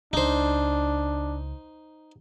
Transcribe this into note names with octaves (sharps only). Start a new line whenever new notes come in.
C#2 D4 D#4 C5